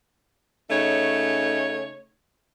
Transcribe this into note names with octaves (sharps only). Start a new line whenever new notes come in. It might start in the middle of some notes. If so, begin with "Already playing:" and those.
C#3 A3 D#4 C#5